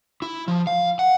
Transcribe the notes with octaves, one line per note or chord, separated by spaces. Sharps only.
E4
F3
F5
F#5